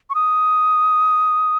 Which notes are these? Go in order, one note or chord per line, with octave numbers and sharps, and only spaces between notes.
C#6
D#6